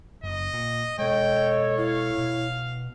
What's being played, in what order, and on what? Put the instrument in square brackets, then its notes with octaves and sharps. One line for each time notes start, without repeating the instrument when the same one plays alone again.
[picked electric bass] F#1 [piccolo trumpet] D#5
[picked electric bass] A#2
[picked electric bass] B2 G#3 [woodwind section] A4 C#5 [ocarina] D#5 [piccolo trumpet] G5
[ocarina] E4 [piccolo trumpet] F5
[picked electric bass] B2